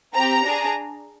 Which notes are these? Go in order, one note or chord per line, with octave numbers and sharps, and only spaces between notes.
C4 G4 A#5
D4 G#4